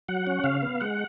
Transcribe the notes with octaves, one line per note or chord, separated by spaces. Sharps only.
F#3 F#5
C#4
C#3 F5
B3
G#3 F#5